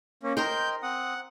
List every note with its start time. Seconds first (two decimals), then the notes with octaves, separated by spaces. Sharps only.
0.23 A#3 C#4
0.37 A#4 C5 D#5 G5 A#5 C6 G6
0.83 C4 F#5 D#6